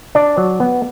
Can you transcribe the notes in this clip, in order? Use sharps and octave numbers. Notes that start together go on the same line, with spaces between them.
D4 D5
F#3
B3